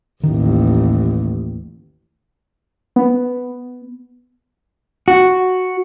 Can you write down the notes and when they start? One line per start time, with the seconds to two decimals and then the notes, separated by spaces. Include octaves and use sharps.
0.23 A1 D#2 D#3
2.96 B3
5.08 F#4